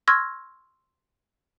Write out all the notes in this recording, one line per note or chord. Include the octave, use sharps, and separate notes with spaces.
C6 C#6 E6 F6 G#6 A#6